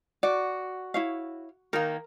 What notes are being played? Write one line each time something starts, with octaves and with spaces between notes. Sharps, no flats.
F#4 D5
E4 C#5 F5
D#3 A#3 A#4